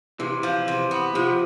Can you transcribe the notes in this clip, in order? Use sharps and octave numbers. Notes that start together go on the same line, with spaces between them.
C3 E3
F3
C3
B3
C3 F3